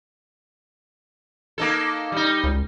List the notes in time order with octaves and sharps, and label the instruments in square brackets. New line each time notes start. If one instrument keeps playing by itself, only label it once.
[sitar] A#3 D#4 A4
G3 D#4
[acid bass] C#2